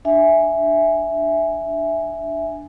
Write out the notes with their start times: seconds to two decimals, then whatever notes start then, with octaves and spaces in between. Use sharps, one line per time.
0.05 D4 E5 G#5